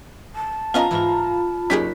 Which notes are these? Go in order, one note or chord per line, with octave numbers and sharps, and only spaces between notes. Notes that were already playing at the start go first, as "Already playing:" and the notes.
A5
B3 C#4 F4 D#5 F5 A#5
G#2 E3 F4 B5
F#1 C#4 D#4 G4 G#4 B6